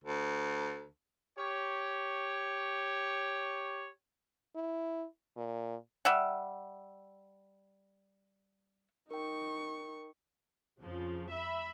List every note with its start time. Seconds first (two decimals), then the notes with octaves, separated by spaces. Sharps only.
0.04 D2
1.38 G4 C#5
4.55 E4
5.37 A#2
6.05 G3 E5 F#5
9.11 D#4 A#4 G5 C#6
10.78 F2 C#3 F3
11.32 E5 B5